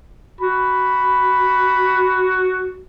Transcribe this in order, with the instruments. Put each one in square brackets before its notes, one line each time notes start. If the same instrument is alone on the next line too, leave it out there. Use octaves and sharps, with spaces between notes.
[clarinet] F#4 [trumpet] B5